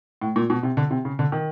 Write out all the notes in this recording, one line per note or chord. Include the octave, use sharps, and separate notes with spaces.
A2
A#2
B2
C3
D3
C3
C#3
D3
D#3